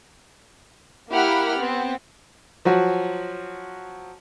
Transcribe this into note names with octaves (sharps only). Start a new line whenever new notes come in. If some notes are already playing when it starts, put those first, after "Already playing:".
A#3 E4 G4 F#5 B5 F6
B3 C4
F3 F#3 F#4